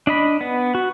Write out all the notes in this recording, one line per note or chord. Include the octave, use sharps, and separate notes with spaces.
D4 D#5 B5
B3
F#4